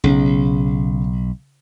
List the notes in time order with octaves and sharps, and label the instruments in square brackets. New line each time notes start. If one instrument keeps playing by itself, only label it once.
[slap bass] B1 [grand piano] C#3